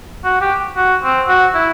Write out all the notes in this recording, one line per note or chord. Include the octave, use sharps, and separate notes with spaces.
F#4
G4
F#4
C4
F#4
E4